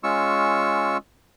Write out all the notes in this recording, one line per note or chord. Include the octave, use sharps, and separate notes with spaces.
G#3 C#4 F4 C#6 E6